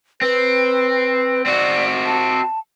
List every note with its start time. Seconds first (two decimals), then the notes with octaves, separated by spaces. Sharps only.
0.21 C4 B4
1.46 C4 F#4 D5
2.06 A5